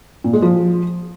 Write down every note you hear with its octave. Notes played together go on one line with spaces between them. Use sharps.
A#2
G#3
F3